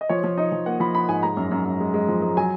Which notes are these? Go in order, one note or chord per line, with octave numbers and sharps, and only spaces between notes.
D#5
F3 C#5
F3
D#4 D#5
F3
A#3 F#5
F3 B5
D#4 B5
G#2 G#5
G#3 A#5
F#2
F#2
F#2
G#3
G#3
F3
G#3
F#3 G#5